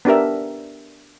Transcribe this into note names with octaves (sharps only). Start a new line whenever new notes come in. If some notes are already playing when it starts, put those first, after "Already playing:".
B3 D4 G4 A#4 E5